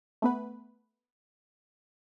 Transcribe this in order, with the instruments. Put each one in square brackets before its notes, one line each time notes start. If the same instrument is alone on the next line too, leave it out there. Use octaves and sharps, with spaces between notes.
[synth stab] A3 B3 B4